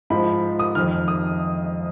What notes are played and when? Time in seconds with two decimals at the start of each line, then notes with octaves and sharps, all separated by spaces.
0.10 G#2 F3 B5
0.59 D#6
0.75 F2 D#3 F6
1.08 D#6